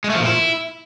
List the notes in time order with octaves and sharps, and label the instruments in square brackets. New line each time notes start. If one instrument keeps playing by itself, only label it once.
[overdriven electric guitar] G#3
A3
F3
A#2
E4